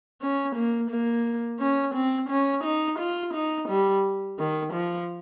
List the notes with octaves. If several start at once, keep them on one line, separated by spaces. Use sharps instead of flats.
C#4
A#3
A#3
C#4
C4
C#4
D#4
F4
D#4
G3
D#3
F3